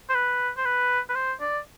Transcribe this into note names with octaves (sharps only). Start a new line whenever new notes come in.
C5
B4
C5
B4
B4
C5
D5